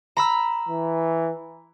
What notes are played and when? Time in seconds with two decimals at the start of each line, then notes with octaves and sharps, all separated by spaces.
0.17 A#5 B5 E6
0.69 E3